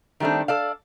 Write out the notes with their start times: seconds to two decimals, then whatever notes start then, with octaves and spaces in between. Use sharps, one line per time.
0.20 D#3 G3 A3 C4 D4
0.48 A4 D5 F5